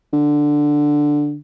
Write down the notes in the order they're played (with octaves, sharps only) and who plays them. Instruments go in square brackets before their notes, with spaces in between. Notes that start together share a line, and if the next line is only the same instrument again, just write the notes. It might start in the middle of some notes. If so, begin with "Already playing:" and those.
[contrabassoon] D3